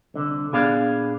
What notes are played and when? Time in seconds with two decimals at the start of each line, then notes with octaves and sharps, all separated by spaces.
0.14 C2 D3
0.53 A#2 B3 D4 G#4 D5 F5